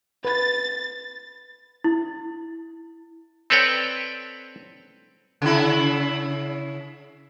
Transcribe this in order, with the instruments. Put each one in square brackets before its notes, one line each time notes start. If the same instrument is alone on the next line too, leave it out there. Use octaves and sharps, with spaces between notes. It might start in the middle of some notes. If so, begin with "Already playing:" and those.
[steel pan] B4 [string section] A6
[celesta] E4
[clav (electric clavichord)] C4 A4 B4 C#5 D5 G5
[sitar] C#3 E4